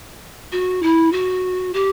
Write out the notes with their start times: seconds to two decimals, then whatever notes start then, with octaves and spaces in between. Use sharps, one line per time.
0.52 F#4
0.82 E4
1.12 F#4
1.73 G4